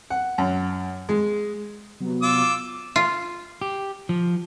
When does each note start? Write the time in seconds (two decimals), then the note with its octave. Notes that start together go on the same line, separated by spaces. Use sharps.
0.10 F#5
0.38 F#2
1.09 G#3
2.00 C3 F#3 B3
2.23 F4 D6 E6
2.96 F4
3.62 G4
4.09 F3